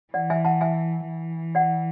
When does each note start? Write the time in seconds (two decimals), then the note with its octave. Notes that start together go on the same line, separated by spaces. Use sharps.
0.14 E3 D5 F#5
0.30 E5 G#5
0.45 F#5 A5
0.61 E5 G#5
1.08 E3
1.55 D5 F#5